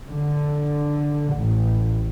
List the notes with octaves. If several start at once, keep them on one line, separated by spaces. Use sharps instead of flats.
D3
A1